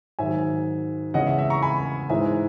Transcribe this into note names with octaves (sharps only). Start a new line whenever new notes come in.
G#2 D#3 F#3 E5 G#5
E2 C#3 G#3 D#5 F#5
E5
E5
A#5 C#6
G#5 B5
G#2 E3 G#3 E5 G#5